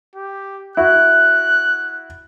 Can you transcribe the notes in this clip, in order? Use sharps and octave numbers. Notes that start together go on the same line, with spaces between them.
G4
E4 F#4 F#6